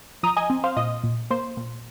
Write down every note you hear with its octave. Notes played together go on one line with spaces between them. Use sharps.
F3 A#5 D#6
D#5 G#5
C4
C5 F5
A#2 D#5
A#2
A#3 C5
A#2